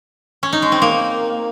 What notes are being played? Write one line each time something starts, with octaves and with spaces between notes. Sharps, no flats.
C#4
D#4
G#3
C4
A#3